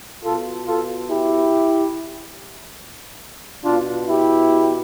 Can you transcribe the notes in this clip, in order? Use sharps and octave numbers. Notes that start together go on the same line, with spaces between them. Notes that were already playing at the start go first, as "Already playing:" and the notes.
B2 F4 A4
F4 A4
E4 G4
B2 D4 F4
E4 G4